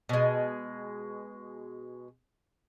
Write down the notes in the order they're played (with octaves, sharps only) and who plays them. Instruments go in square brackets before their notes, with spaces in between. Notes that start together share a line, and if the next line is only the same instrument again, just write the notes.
[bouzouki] B2 G#3